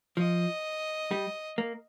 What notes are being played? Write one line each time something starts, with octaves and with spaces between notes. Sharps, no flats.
F3 D#5
G3
A#3